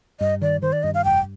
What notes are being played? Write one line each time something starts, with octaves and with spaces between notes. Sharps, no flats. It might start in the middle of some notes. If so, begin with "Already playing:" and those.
G2 D#5
D#3 D5
D#3 C5
D5
G2 D#5
F5
F1 G5